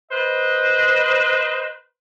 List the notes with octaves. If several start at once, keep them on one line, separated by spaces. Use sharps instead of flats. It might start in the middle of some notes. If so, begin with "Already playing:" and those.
B4 C5 D#5